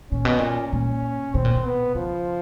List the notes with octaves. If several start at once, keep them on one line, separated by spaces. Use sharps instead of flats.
A#2 C#4
B2
A#2
A#2
B2 C4
A#2
B2
B3
C#3 F3